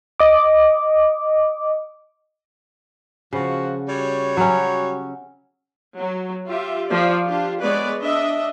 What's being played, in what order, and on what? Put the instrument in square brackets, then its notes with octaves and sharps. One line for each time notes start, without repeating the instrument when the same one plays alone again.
[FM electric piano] D#5 D6
[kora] C#3 [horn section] F3 F#4
[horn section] G3 F#4 C#5
[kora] F#3 C#4
[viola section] F#3
F4 G4 E5
F3 D5
D4 F4 G4
G#3 B3 B4 C#5 D5
D4 D#5 E5